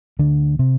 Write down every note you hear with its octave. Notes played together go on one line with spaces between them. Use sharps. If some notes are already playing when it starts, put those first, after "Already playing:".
D2 D3 D4
C3 C4